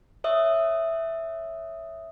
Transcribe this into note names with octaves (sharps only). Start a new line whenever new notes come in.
C#5 E5 D#6